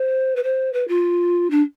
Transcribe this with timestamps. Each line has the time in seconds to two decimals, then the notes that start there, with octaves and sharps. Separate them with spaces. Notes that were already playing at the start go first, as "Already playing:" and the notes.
Already playing: C5
0.36 B4
0.43 C5
0.73 B4
0.88 F4
1.50 D4